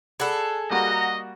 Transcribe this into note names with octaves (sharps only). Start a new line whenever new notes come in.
G#4 A4 D5 F#5 B5
G3 A#3 F#4 D#5 F#5 A#5